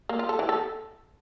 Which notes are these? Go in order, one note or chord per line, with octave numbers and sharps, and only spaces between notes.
A#3
F4
A4
E3
A4